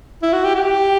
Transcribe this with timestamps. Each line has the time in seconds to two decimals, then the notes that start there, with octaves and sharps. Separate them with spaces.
0.22 E4
0.33 F#4
0.45 G4
0.55 G4